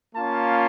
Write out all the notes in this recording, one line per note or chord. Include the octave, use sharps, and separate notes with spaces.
A#3 C#4 F4 A5